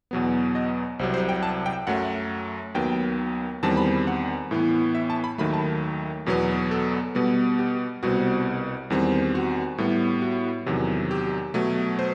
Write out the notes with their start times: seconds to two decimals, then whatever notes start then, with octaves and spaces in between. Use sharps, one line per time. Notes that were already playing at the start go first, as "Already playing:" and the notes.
0.11 E2 B2 F#3 B3
0.55 D#5
0.99 C2 C3 F#3 C5
1.14 C5
1.29 G5
1.43 A5
1.66 G5
1.87 F#2 F#3 A3 F#5
2.75 D#2 D#3 F#3 B3 G5
3.63 E2 D#3 G3 C4 A5
3.77 B5
4.07 F#5
4.51 A2 E3 B3
4.95 E5
5.10 A5
5.24 B5
5.38 D#2 D#3 F#3 A3 B5
5.53 A5
6.26 E2 B2 F#3 B3
6.71 A4
7.15 B2 G3 B3
7.59 G4
8.03 C2 B2 G3 C4 F#4
8.90 E2 D#3 G3 C4
9.35 F#4
9.78 A2 G3 B3
10.22 F#4
10.66 E2 C3 D#3 F#3
11.11 G4
11.54 B2 F#3 A3
11.99 C5